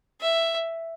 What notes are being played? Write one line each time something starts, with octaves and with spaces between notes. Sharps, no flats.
E5